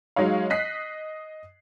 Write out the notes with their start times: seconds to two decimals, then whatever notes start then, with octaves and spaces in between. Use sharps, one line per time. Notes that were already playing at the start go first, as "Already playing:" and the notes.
0.16 F#3 G#3 D#4 C#5 F5
0.50 D#5 F#6 B6 C7